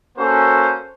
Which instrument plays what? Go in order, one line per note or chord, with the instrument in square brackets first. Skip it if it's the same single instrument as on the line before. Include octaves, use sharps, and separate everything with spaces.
[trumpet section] A#3 C#4 F#4 A4 C5